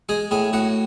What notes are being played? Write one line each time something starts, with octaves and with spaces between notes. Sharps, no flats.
G#3 G#4
A2 G#4
A2 F#4